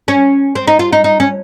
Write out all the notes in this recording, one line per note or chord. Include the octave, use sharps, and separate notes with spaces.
C#4
C4
D#4
F4
D#4
D#4
C#4